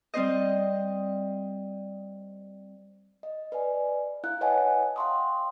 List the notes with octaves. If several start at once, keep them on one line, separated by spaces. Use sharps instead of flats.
G3 C4 C5 D#5
D#5
B4 D5 G#5
E4 F5 F#6
B4 C#5 D#5 F#5 G#5 A5
F5 G5 A5 C6 C#6 D#6